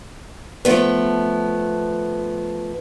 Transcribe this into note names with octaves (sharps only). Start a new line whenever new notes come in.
F3 A3 B3